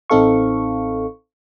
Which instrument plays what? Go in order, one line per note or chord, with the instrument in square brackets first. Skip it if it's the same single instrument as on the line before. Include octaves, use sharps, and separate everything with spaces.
[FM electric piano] A1 C4 D#4 A4 F5 C#6